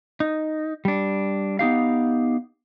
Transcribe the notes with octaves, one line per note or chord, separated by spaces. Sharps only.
D#4
G3 D4
B3 D#4 G4 F5